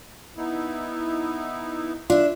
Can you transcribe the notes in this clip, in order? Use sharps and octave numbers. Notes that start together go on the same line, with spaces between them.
B3 D#4 E4
D4 F4 E5